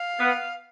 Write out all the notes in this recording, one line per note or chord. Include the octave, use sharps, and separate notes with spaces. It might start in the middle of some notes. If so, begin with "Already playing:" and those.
Already playing: F5
B3